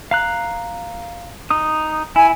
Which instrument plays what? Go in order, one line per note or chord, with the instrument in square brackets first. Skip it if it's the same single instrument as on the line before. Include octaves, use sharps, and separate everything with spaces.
[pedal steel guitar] F5 A#5 F#6
D#4 D#6
[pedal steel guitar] E4 [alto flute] G#5